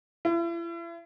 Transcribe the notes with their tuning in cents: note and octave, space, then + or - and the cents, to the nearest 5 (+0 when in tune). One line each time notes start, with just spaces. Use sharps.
E4 +40